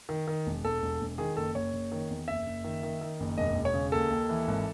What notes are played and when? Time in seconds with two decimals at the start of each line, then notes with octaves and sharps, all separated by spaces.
0.09 D#3
0.27 D#3
0.46 E1
0.64 E1 A4
0.82 E1
1.01 E1
1.18 D#3 G#4
1.37 F#1 A4
1.55 F#1 C#5
1.73 F#1
1.92 D#3
2.10 E2
2.28 F#1 E5
2.46 F#1
2.64 D#3
2.83 D#3
3.01 D#3
3.20 F#1
3.38 E1 D#5
3.55 E1
3.65 C#5
3.74 C#3
3.92 D#2 A4
4.10 D#2
4.29 E3
4.48 G#1